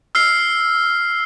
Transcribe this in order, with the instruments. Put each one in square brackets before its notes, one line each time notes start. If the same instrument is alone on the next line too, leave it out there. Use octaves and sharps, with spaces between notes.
[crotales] E6 F6 C7